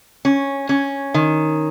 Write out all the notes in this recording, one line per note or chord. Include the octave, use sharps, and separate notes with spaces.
C#4
C#4
D#3